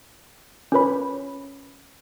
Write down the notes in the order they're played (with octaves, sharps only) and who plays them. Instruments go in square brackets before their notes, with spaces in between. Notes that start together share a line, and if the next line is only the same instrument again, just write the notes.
[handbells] C#4 F4 A#4 B4 C#5 B5